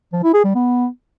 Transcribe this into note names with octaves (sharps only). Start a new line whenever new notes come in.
F3
E4
G#4
G3
B3